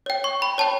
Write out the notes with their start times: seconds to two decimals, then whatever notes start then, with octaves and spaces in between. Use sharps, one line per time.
0.06 C#5 G5
0.24 C#6
0.42 B5
0.58 C#5 G5 A5